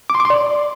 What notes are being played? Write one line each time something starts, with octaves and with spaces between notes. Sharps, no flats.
D6
C6
D6
C6
D5